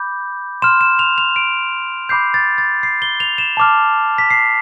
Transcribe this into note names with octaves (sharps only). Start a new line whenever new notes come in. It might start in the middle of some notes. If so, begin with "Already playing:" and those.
Already playing: B5 D6 G6
C6 F6 E7
E7
F7
F7
D7
B5 D6 G6 C7
A6
A6
C7
G7
F7
E7
A5 D6 F6
B6
C7